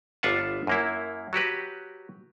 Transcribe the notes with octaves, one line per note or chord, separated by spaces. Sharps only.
G1 D4 F4 E5 F#5 A5
F#2 A#3 E4
F#3 F#4 G4 B4